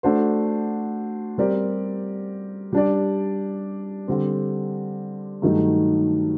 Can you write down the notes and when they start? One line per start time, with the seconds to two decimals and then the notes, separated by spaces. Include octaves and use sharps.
0.03 A3 D4 F#4 C5
1.38 G3 C4 G4 A#4 D5
2.72 G3 D4 G4 D5
4.08 D3 G3 C4
5.42 G2 D#3 F#3 A3 D#4